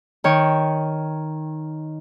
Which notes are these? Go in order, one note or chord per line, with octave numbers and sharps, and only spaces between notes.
D#3 C#5 G5